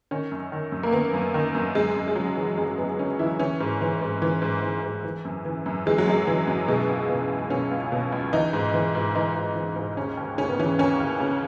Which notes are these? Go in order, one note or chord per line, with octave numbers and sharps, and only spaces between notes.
D#3 C#4
F#2
D#3
F#2
A#3
D#3 B3
F#2
D#3
F#2
F#2 G#3
F#2
G#3
C#3 F#3
E3
F#2 G#3
F#2 B3
C#3 C#4
E3 E4
E3 C#4
G#2
E3
G#2
E3
G#2
E3
G#2
E3
F#2
E3
F#2
E3 G#3
F#3
F#2 G#3
E3
F#2
B2 G#3
C#2
B2
C#2
B2 C#4
C#2
B2
C#2
E3 D#4
G#2
E3
G#2
E3 D#4
G#2
E3
G#2
D#2 C#4
D#2
C#3 C#4
B3
E3 C#4
D#2 C#4
D#2
C#3